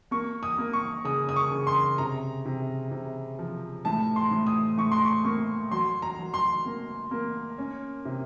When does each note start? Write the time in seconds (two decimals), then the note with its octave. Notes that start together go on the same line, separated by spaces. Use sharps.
0.11 A#3 C#6
0.43 D#6
0.58 A#3
0.73 C#6
1.05 C#3 D#6
1.29 D#6
1.36 C#6
1.51 C#3
1.67 C6
1.98 C3 A#5
2.46 C3
2.91 C3
3.39 F3
3.85 A2 A5
4.16 C6
4.31 A2
4.47 D#6
4.78 A2 C#6
4.92 C6
5.05 C#6
5.24 A#3 C#6
5.71 F#3 C6
6.02 A#5
6.19 F#3
6.34 C6
6.65 A#3
7.11 A#3
7.58 C#4
8.05 C3